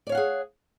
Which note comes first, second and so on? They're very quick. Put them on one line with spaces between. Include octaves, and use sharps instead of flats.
D5 C#5 F5 F#5 G#4